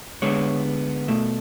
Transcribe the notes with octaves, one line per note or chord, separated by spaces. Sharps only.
D3 G#3 B3 C#5
B2 A3